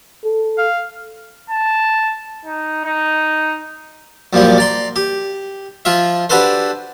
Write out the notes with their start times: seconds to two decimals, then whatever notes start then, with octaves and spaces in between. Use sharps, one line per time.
0.25 A4
0.58 F5
1.50 A5
2.45 D#4
2.85 D#4
4.33 F#2 A#2 F3 G3
4.58 D5 A#5 C6
4.96 G4
5.85 F3 F4 E5
6.29 D4 F#4 G4 A4 B4 C5